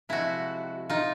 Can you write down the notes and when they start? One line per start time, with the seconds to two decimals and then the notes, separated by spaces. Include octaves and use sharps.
0.09 C3 F3 G#3 E4 F#4
0.90 D#4 F4